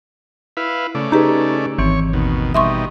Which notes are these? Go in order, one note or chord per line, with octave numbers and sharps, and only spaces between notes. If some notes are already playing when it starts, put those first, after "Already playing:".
E4 B4 F5
C#3 A3 D5
D#4 G4 G#4 B4
G#1 E3 C4 C#5
D#2 B2
B2 G3 D#4 E5 C6 C#6